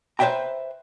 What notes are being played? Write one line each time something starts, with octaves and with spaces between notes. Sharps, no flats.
B4 C5 D#5 E5 G5 A#5